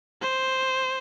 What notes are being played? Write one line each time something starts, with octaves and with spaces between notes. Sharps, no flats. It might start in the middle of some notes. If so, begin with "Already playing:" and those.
C5